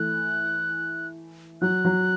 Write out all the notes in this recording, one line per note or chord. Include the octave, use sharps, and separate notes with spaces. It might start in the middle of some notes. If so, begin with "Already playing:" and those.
Already playing: E3 A3 F#6
F#3 F#6
F#3